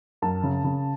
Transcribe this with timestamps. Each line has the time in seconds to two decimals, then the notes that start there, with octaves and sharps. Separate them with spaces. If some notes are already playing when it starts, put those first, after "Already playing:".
0.22 F#2 A5
0.43 C#3
0.64 C#3